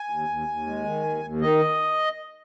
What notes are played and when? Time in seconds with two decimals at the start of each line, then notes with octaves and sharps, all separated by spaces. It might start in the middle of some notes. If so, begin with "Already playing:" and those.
Already playing: G#5
0.10 D#2
0.29 D#2
0.48 D#2
0.67 G#3
0.85 D#3
1.04 D#2
1.23 D#2
1.41 D#3 D#5